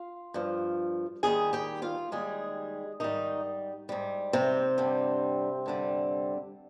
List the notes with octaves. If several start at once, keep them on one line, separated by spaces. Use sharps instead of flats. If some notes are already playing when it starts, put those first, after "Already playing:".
Already playing: F4 F5
G2 F3
D#2 D#3 G3 G#4 G#5
G4 G5
F4 F5
D#2 D#3 G3 G#3 G#4
G#2 D#3 G3 D#4
G#2 G3
C3 C4
G2 D3 G3
G2 D3 G3